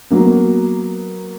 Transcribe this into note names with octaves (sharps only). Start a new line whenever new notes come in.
F#3 A#3 B3